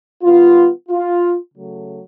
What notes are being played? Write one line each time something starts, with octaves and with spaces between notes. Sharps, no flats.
D#3 G3 B3 F4
F4
C#3 F#3 A3